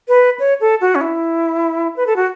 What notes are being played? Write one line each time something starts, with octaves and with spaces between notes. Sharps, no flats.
B4
C#5
A4
F#4
C#4
E4
B4
A4
F#4